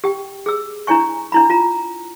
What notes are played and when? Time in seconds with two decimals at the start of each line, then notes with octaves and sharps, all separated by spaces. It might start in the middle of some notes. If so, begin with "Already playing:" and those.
0.04 G4 G5
0.46 G#4 E6
0.87 D4 E4 C#5 G#5 C#6
1.32 D4 E4 B5
1.50 F4 A#5